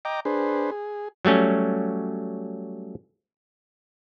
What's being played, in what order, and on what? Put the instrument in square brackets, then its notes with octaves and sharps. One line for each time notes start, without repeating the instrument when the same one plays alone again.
[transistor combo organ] D#5 G5 A#5 D6
D4 G#4 B4 C5
G#4
[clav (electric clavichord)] F#3 G3 A3 C#4